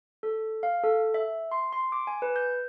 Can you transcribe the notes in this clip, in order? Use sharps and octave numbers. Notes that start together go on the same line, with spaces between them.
A4
F5
A4
E5
C6
C6
D6
G#5
B4
G6